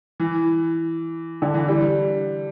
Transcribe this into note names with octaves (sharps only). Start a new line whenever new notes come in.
E3
D3
E3
G3